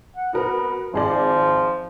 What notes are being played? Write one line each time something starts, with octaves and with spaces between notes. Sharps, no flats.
F#5
B3 F#4 A#4 B4
G#1 F3 G#4 D5